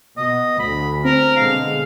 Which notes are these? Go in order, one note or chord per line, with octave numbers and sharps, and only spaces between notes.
B2 D#5
D2 B5
C4 A#4
B2 D3 G#3 F5